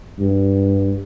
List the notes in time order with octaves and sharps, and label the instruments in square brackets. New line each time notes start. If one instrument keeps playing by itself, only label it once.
[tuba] G2